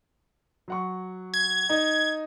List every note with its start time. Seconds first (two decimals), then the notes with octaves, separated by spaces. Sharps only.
0.68 F#3 F#5 C#6
1.34 G#6
1.70 D#4